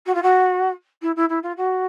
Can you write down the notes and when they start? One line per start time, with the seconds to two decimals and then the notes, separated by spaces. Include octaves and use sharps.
0.06 F#4
0.14 F4
0.22 F#4
1.01 E4
1.16 E4
1.29 E4
1.42 F4
1.56 F#4